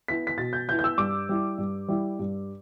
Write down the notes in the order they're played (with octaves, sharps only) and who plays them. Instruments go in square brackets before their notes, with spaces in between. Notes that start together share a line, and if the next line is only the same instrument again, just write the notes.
[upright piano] B3 E4 B6
B6
B2 A6
G6
B3 G6
E4
G6
E6
G2 D6
G3 E4
G2
G3 E4
G2